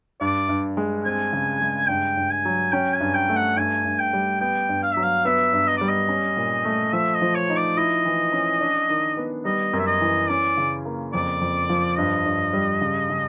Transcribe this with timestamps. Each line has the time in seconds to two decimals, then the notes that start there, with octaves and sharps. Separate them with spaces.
0.21 G2 D5
0.49 G2
0.77 G#3
1.05 C4 G#5
1.33 C#3
1.61 G#3
1.88 G2 G5
2.17 G2
2.31 G#5
2.45 F#3
2.72 C#4 G5
2.94 G#5
3.00 G2
3.15 G5
3.29 A3
3.36 F#5
3.57 G2 G#5
3.85 G2
3.99 G5
4.13 G3
4.41 B3 G5
4.69 G2
4.83 F5
4.94 F#3 E5
5.03 F5
5.25 B3 E5
5.53 G2
5.67 D#5
5.77 G3 D5
5.89 D#5
6.09 C#4
6.37 A#2
6.65 A3
6.93 F3 E5
7.14 D#5
7.22 F3
7.35 C#5
7.49 D#4
7.56 D5
7.77 E4 D#5
8.05 E3
8.33 C#4
8.61 D4
8.90 D#3
9.17 B3
9.45 G3 D#5
9.73 F#2
9.79 E5
9.87 D#5
10.01 E3
10.29 C#4 D5
10.57 C#3
10.85 A#3
11.13 F2 D5
11.41 F2
11.70 F3
11.97 G2 D#5
12.25 G2
12.53 G3
12.81 C#3
13.10 C#3